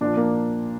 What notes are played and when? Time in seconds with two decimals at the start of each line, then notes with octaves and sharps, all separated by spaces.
0.01 A#2 F3 D4
0.17 A#3